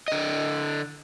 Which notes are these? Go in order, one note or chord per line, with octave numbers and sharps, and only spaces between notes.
D3 D#5